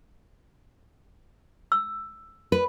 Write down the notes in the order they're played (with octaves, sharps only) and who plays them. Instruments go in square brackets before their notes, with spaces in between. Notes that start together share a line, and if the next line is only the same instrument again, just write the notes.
[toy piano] E6
[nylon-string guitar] B4